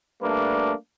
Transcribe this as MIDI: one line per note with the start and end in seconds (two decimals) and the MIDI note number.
0.22 0.73 55
0.22 0.73 57
0.22 0.73 58
0.22 0.73 62
0.22 0.73 71